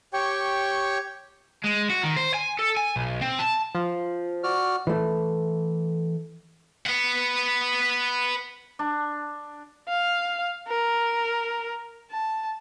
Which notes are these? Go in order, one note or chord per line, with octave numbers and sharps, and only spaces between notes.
G4 C#5 G5 C#6
G#3
F#4
D#3
C5
G#5
A4
G#5
B1
C4
A5
F3
F#4 D5 F6
E3 A3
B4 F#5
D4
F5
A#4
A5